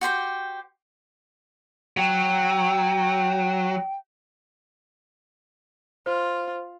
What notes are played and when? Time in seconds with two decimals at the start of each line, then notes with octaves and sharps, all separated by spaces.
0.01 F#4 G4 C5 G5
1.97 F#3 G5
6.06 F4 C5